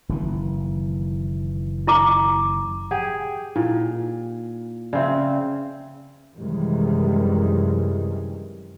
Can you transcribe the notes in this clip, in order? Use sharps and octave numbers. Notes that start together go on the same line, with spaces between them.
F#1 D#3 E3
E4 A#5 D6
G4 G#4 F#5 G5
A#2 D#4 E4
C#3 C4 D5 E5
F#2 C3 D#3 E3 G3 G#3